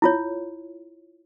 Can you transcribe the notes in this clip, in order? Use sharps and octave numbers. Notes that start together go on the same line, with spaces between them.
E4 F4 C#5